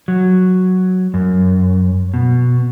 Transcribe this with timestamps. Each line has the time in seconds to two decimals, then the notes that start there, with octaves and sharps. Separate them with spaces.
0.08 F#3
1.14 F#2
2.14 B2